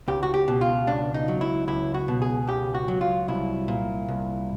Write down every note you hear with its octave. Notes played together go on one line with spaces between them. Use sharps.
C#2 G4
F#4
G4
B2
F4
C#2 D4
D#4
F#3
E4
C#2 E4
F#4
B2
G#4
C#2 G4
F#4
F#3
F4
C2 E4
A#2
C2